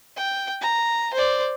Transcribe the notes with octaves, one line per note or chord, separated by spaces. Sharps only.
G5
A#5
C5 D5